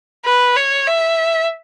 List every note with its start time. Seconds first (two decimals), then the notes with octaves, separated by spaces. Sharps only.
0.25 B4
0.56 C#5
0.88 E5